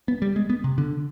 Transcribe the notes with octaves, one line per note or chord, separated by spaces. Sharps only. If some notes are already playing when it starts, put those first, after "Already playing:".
B3
G3
G#3
B3
C3
D3